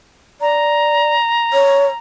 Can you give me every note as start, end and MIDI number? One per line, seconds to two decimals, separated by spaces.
0.41 1.15 74
0.41 1.98 82
1.53 1.86 73